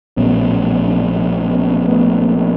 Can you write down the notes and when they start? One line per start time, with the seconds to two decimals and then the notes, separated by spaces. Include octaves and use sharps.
0.17 A#1 A2 F#3 B3 C#4
0.85 C4 D4
1.53 B3 C#4
1.87 A3 B3
2.21 A#3 C4